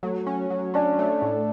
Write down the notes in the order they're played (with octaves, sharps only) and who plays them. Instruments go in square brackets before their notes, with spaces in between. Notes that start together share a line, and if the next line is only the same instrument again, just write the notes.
[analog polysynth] F#3 [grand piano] A3
[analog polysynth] C#4
F#3
[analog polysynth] C#4 [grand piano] D4
[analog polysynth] A3
A2